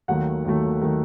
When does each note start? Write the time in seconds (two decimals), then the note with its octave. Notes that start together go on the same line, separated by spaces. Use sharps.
0.08 D#2 D#3 F#3 A3 F#5
0.45 D#2 D#3 F#3 A3
0.81 D#3 F#3 A3